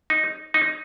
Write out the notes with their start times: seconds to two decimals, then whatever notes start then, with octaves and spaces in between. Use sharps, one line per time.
0.10 D#4
0.54 D#4